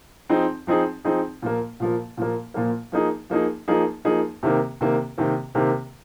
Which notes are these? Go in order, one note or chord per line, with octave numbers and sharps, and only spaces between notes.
F3 C4 D#4 G#4
F3 C4 D#4 G#4
F3 C4 D#4 G#4
A#2 F3 A#3
A#2 F3 A#3
A#2 F3 A#3
A#2 F3 A#3
F3 A#3 D#4 G#4
F3 A#3 D#4 G#4
F3 A#3 D#4 G#4
F3 A#3 D#4 G#4
C3 D#3 A#3
C3 D#3 A#3
C3 D#3 A#3
C3 D#3 A#3